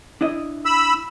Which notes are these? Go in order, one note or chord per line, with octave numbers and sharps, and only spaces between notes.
D4 E4 D#5
B5 E6